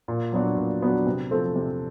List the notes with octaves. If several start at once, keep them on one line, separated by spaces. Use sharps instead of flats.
A#2
F#3 B3 D4 F#4
A#2
F#3 B3 D4 F#4
C3
F3 A3 C4
C3